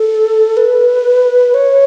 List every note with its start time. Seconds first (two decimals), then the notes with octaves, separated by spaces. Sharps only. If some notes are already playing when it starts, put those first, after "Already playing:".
Already playing: A4
0.57 B4
1.54 C#5